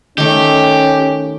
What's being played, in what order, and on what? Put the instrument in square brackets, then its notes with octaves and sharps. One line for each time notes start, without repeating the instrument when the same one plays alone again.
[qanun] D#3 A3 [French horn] C#4 [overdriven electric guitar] G4